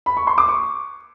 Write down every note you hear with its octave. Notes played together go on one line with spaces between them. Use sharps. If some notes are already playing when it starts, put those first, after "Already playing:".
B5
C#6
C6
D6
C#6